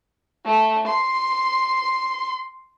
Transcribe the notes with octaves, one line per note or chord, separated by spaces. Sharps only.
A3
C6